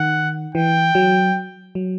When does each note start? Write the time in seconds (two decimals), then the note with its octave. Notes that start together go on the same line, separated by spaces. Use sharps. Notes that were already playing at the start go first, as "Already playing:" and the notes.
Already playing: D#3 F#5
0.55 E3 G5
0.95 F#3
1.75 F#3